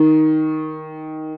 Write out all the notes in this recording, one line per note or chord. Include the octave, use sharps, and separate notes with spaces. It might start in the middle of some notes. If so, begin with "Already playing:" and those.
Already playing: D#3